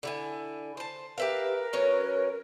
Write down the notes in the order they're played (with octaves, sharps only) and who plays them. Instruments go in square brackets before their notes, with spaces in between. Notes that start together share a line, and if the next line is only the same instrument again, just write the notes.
[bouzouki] D3 E4 G#5
C5 A5
[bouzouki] G4 E5 F5 [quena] A#4 [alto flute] B4
[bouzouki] F#3 C#4 C#5 [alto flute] B4